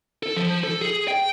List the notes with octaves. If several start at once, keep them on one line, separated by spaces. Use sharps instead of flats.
A4
F3
A4
G#4
G5